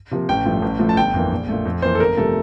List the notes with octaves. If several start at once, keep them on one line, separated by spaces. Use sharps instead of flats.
C3 F3 A#3
A1 G5
G2 F3 A3
A1
A2 F3 A3
A5
G1 G5
F2 E3 A#3
A#1
A#2 A3
F2
E3 A#3 C5
A4
G1 A#4
C3 F3 A3 A4